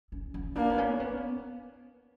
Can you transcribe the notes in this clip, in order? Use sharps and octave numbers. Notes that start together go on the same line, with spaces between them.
C#4
C#4
A#3 D4
B3
C#4
B3